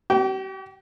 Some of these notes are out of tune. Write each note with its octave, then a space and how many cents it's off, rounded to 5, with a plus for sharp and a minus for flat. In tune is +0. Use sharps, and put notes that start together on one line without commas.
G4 -45 G5 +0